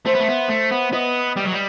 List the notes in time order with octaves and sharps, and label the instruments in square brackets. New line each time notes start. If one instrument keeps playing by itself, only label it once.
[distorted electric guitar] A3 [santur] C5 E5
[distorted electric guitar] B3
A3
B3
A3
B3
[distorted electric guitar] B3 [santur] B4 D#5
[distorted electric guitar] G3
F#3
G3